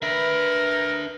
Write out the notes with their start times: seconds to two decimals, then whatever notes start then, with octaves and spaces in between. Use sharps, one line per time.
0.02 D4 A#4 B4 E5